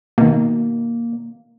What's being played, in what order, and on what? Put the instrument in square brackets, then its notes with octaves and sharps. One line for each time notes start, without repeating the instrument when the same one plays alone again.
[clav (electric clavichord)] B2 D#3 [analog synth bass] A#3